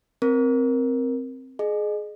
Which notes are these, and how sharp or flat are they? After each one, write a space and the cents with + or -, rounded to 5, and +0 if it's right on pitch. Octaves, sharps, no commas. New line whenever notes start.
C4 +0 A#4 +10
G#4 +25 D#5 -30